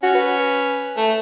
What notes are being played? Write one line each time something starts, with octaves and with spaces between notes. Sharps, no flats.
C#4 F#4
B4
A3